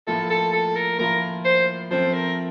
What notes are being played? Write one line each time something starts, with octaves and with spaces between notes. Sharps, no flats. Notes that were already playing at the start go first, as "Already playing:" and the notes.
A2 F3 A#3 F4 A4
A4
A4
A#4
A2 F3 A#3 F4 A#4
C5
F3 A3 C4 C5
A#4